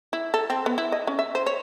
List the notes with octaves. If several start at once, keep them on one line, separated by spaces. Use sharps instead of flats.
E4
A4
C4
B3
E4
D#5
C#4
E5
C5
C#5